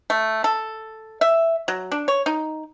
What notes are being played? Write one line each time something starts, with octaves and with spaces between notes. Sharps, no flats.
A3
A4
E5
F#3
D4
C#5
D#4